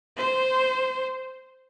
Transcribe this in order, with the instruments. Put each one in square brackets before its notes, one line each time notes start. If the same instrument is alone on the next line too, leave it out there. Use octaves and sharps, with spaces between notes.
[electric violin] C5